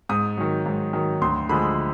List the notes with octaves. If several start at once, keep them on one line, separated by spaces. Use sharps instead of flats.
G#2 D#6
D#3 F#3
G#2
D#3 F#3
D2 C6
D3 F3 G#3 B5